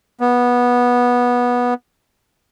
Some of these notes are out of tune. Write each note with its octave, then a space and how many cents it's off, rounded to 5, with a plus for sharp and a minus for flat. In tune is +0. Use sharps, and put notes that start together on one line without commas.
B3 -15